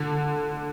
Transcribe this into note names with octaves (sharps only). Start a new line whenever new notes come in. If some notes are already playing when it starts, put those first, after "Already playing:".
Already playing: D3